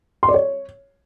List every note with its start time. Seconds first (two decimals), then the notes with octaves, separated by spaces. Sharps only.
0.23 C6
0.28 D5
0.34 C#5